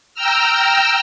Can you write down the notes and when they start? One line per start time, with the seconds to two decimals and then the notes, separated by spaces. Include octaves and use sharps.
0.14 G5 A#5 E6 F6